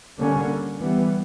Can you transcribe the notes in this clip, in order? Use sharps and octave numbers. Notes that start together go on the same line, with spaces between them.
D3 G3 A#3 C#4
E3 G3 B3